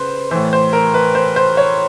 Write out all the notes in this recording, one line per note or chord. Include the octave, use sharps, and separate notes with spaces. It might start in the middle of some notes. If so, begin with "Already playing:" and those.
Already playing: C#3 B4 C5
A2 E3 C5
C5
A#4
B4
C5
C5
C#5